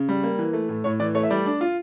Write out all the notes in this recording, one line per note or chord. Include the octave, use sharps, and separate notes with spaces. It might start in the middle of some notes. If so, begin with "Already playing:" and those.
Already playing: C#3
G3
A#3
E3
A3
A2
A2 C#5
E3 D5
A3 C#5
E5
G3 D5
D4
F4